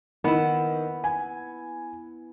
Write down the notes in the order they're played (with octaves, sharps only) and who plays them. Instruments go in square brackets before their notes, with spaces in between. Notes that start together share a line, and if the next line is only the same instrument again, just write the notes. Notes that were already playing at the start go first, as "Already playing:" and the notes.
[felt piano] D#3 [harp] B3 E4
[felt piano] G#5